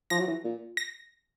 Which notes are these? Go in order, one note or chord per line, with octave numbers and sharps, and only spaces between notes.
F3 A#6
F#3
E3
A#2
A#6